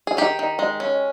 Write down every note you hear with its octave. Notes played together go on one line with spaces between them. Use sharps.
G#4
D#3 G4
D#3
G#3
C#4